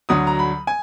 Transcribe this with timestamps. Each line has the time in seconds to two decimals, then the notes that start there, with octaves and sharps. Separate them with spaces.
0.09 D2 D3 F#3 D#6
0.27 A#5
0.39 B5
0.67 G#5